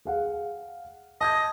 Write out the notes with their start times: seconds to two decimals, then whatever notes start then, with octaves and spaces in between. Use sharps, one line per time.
0.05 G#4 F5 F#5
1.21 D#5 A5 G6 G#6